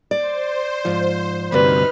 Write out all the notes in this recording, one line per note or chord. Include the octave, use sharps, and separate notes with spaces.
C5 D5
G#2 F3
D2 G2 C3 D#4 B4 F6